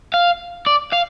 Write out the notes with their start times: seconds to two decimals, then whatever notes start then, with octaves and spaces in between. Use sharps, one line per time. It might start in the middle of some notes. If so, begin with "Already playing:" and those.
0.14 F5
0.67 D5
0.93 F5